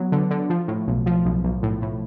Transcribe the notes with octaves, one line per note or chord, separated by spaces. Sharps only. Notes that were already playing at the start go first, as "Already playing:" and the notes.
Already playing: F#3 B3
D3
D3
F3
A2
B1
F3
B1
B1
A2
A2